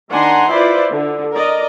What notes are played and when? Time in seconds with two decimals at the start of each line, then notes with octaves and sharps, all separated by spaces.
0.10 D#3 D4 F#5 G#5 A#5 C6
0.50 E4 F4 B4 C5 D5
0.92 D3
1.33 A#4 D5 D#5